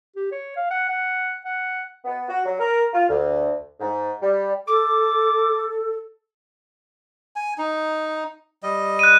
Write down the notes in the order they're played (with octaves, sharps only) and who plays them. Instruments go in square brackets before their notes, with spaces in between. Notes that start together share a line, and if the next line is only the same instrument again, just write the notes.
[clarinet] G4
C#5
F5
F#5
F#5
F#5
[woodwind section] B3
F#4
F#3
A#4
F4
D2
G#2
G3
[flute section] A4 [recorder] D6
[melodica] G#5
D#4
G3 D#5
[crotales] F#6 D#7